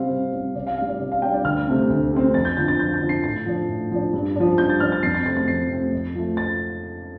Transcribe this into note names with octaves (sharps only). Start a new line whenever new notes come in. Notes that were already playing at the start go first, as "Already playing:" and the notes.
Already playing: C3 G3 C4 F5
C3
G3 C4
C3 D5
F5
G3 D4 F5
D5
C3 D5
F5
G3 D4 G5
D5
D2 F6
C3 A3 C4
D2
C3 A3 C4
F2 A6
G6
D3 F3 C4 A6
A6
F2 G6
A6
D3 F3 C4
C7
A2 A6
F3 D4
A2
F3 D4
G2
F3 D4
G2 G6
A6
F3 D4 F6
A6
F2 C7
A6
C3 A3 C4 A6
A6
F2 C7
C3 A3 C4
F2
F3 A3
A6